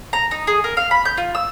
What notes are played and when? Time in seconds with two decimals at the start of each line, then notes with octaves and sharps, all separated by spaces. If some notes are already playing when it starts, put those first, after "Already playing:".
0.13 A#5
0.31 D#4
0.47 G#4
0.64 A#4
0.77 F5
0.91 B5
1.05 G6
1.17 F4
1.35 E6